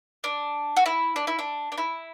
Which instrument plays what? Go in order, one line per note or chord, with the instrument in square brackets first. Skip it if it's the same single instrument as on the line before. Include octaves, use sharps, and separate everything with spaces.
[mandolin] D4
F#4
E4
D4
E4
D4
D4
E4